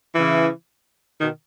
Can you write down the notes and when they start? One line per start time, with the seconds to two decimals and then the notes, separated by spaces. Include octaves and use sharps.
0.15 C#3 E3
1.19 B2 D#3